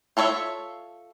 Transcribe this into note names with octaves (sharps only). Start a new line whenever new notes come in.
F4 A4 C#5 D5 E5